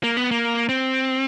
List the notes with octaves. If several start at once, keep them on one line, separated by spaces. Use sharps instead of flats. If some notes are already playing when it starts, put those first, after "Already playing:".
A#3
B3
A#3
C4